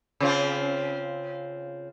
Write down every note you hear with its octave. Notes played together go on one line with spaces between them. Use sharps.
C#3 C4 F4